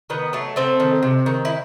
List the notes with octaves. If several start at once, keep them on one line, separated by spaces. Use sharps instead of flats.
D#3 B3
F#3 A3
A3 C4
D#3
C3
D#3
E4